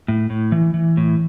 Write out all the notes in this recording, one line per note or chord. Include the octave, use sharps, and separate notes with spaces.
A2
A2
E3
E3
A2